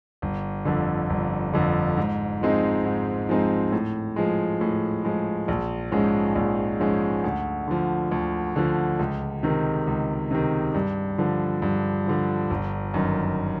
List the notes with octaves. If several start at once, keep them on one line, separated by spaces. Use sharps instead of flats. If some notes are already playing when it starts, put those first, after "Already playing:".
G1
F2 D3
G1
F2 D3
G#2
F3 G#3 C4 D#4
G#2
F3 G#3 C4 D#4
A2
F3 G#3
A2
F3 G#3
A#1
G#2 F3 G#3 C#4
A#1
G#2 F3 G#3 C#4
D2
D3 F3
D2
D3 F3
C#2
C3 D#3
C#2
C3 D#3
G2
D3 F3
G2
D3 F3
G1
F#2 D#3